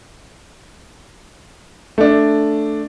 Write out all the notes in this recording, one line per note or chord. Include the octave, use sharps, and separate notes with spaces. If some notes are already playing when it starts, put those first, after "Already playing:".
A3 D4